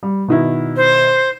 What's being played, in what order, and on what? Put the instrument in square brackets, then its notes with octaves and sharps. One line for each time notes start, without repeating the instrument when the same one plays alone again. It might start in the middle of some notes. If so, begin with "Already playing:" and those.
[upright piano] G3
B2 D#3 E4
[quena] C5